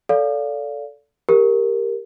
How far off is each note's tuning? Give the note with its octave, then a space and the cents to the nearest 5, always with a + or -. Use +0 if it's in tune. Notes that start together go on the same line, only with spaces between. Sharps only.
A4 +0 D5 -35 F5 +0
G4 +15 A#4 -5